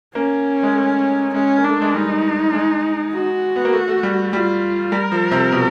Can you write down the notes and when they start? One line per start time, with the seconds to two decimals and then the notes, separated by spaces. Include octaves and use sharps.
0.15 A#3 C#4
0.63 G#3
0.74 A3
1.34 G#3 C#4
1.58 A#3
1.64 A3 D4
1.82 G#3
1.94 G3 D#4
2.53 G#3
3.14 F#4
3.56 B3
3.65 A#3
3.73 A3
3.88 A3
4.03 G3
4.33 G3 F4
4.92 G3 A#4
5.12 F3
5.31 C3
5.52 B2